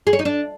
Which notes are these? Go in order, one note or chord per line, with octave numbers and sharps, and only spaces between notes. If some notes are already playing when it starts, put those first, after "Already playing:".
G#4
C#5
D#4
D4